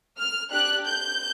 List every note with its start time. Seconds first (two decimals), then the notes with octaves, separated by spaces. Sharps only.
0.18 F6
0.51 D4 G4 F#6
0.86 G6